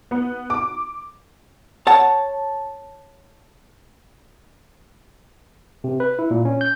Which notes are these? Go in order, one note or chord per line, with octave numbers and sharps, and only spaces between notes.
B3
D6
C#5 F#5 A5
C3
B4
E4
A#2
C#4
G6